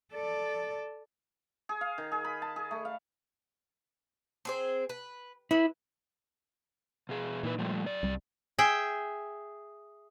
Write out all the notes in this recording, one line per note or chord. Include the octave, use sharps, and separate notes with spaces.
A4 D5
G#4
F5
D#3
G#4
B5
A5
G#4
A3
F5
C4 G#4 C5
B4
B3 E4
B2 G#4
A#2 E3 D#4 B4
F3 G3 A3
F#2 D5
C2 G3
G#4 E5 G5